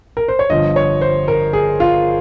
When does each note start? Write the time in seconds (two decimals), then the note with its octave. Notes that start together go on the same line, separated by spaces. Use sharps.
0.17 A#4
0.28 C5
0.39 C#5
0.50 G1 G2 F3 D#5
0.76 C#5
1.01 C5
1.28 A#4
1.53 G#4
1.80 F4